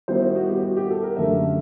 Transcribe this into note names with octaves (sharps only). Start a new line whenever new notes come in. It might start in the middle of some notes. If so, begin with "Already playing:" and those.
D#3 G3 B3 E4 C5
F#4
F#4
G4
F#4
G4
A4
A#4
F#2 D3 F#3 A3 E5